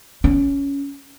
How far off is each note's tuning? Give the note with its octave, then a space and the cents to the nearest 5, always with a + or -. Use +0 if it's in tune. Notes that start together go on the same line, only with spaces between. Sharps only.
C#4 +10